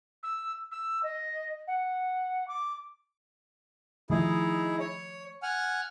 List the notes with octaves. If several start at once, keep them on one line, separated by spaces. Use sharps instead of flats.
E6
E6
D#5
F#5
D6
D#3 F3 A3 D#4 E4 G#4
C#5
F#5 G#5 F6